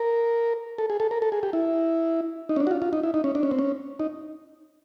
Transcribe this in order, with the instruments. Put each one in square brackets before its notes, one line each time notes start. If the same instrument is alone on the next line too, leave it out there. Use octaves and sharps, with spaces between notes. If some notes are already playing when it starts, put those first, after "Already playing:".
Already playing: [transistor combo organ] A#4
A4
G#4
A4
A#4
A4
G#4
G4
E4
D#4
C#4
D4
F#4
F4
F4
D#4
E4
D#4
C#4
D4
C#4
C4
C#4
D#4